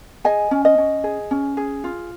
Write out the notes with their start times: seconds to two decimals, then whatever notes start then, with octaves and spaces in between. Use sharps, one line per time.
0.24 G#4 D#5 G#5
0.51 C#4
0.65 D#5
0.78 C#4
1.04 G#4
1.31 C#4
1.57 G#4
1.84 F4